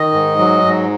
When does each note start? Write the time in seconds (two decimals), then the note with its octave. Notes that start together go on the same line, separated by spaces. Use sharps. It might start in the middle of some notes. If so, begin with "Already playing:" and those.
Already playing: D#3 D#5
0.13 G#2
0.39 F#3
0.65 G#2